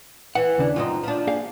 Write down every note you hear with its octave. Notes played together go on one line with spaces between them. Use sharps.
E3 F#5
D#2 C#3 D4
F#2 C4 D#4 F4
F3 D4
A#3 G#4 F5